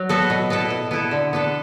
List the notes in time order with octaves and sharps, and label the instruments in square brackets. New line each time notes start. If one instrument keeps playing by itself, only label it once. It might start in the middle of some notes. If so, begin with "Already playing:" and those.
Already playing: [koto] F#3
B3 F#4 A4
B2
B3 E4 A4
B2
B3 E4 A4
D3
B3 D4 A4